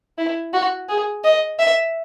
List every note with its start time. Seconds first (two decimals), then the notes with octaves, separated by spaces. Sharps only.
0.18 E4
0.53 F#4
0.89 G#4
1.24 D#5
1.59 E5